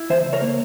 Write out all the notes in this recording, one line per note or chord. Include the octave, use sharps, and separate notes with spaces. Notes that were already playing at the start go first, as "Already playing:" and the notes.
Already playing: E4
E3 C5 E5
C#2
A#4 C#5
A#3